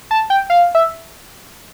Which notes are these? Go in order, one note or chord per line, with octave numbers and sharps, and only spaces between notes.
A5
G5
F5
E5